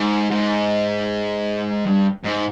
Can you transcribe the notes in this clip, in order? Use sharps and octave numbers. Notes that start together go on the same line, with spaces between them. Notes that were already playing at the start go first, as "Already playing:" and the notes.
Already playing: G#2
G#2
G2
G#2